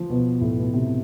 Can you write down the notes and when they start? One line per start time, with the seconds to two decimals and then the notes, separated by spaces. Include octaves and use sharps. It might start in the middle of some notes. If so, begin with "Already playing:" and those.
Already playing: F3
0.10 B2
0.41 A2
0.57 B2
0.73 C3